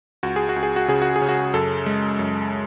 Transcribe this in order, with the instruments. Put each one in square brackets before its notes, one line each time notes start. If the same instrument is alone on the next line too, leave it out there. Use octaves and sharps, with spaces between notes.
[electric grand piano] C#2 F#4
G#4
F#4
C#2
G#4
F#4
C#3 G#4
F#4
G#4
C#3
F#4
F#2 A4
G#3
F#2